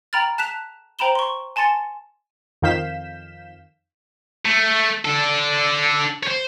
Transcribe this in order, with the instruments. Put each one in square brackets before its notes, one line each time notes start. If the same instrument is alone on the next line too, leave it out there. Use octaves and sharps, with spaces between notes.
[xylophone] G5 A#5 B5 F6 A6
A5 F#6 B6 E7 F7
C5 G5 A#5 B5 E7 G7
C6 C#6
G#5 A5 C6 A6 C#7
[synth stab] F2 D#3 F5 G6 B6 E7
[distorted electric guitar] A3
D4 A4
C5 C#5